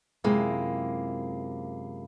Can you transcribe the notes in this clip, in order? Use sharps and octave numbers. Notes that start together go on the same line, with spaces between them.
F#2 C3 G#3 A#3 E4 F4